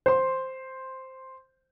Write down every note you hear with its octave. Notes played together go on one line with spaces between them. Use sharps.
C5 C6